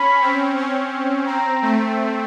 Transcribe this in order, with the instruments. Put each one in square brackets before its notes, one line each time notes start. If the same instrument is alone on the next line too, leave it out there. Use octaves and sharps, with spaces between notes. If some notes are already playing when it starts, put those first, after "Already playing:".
Already playing: [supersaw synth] C#4 [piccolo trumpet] B5
[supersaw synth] C4
C#4
[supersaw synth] C4 [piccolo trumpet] A#5
[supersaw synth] A3